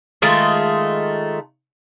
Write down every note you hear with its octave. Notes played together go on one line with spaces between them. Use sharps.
D#3 G#3 A3 F4